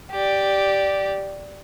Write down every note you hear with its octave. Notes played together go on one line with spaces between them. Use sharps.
G4 D5